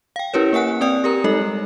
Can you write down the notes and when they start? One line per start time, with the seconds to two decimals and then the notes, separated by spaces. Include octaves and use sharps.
0.16 F5 G5
0.34 C#4 E4 G4 A#4 B4 C#5
0.53 A#3 A#4 F#5 G#5 F#6
0.81 C4 B4 D5 G5 D#6
1.04 G4 A#4 A#5
1.24 G3 G#3 D#4 A4 D#5